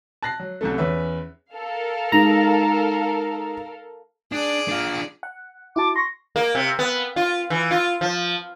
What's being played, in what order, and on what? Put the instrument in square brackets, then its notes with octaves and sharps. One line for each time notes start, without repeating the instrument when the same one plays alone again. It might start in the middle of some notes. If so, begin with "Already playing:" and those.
[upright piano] A5 F#6 A#6 C7
F#3
C2 F#2 A3
E2 C#4 B4 E5
[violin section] A4 A#4 F5
[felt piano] G#3 D#4 [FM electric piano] A#5
[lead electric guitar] D4 [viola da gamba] G#4 D5
[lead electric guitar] D4 F4
[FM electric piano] F#5
[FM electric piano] E4 F#4 A5 [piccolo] D6
[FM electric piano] C6 C#6 [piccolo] A#6
[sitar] A#3
C3
B3
F4
E3
F4
F3